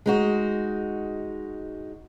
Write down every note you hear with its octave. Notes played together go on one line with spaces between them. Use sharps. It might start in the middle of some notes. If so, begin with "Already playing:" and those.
G#3 D#4 F#4